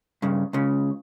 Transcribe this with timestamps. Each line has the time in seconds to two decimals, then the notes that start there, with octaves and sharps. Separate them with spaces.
0.22 G2 C#3
0.53 C#2 C#3